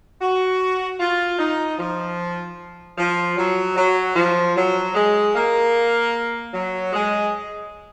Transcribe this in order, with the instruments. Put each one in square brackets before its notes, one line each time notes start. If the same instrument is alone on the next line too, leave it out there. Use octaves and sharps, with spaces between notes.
[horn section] F#4
F4
D#4
F3
F3
F#3
F#3
F3
F#3
G#3
A#3
F#3
G#3